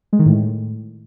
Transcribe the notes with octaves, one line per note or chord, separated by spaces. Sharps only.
G#3
D#3
A2